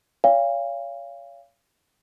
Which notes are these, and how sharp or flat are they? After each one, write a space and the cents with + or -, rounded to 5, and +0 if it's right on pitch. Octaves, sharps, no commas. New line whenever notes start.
C#5 +30 F5 -20 G#5 -45